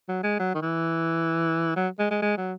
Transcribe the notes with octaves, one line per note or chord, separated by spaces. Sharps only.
F#3
G#3
F#3
D#3
E3
F#3
G#3
G#3
G#3
F#3